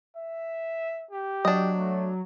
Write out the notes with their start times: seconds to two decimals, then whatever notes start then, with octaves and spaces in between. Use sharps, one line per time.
0.16 E5
1.11 G4
1.45 F#3 D4 D#5
1.78 A3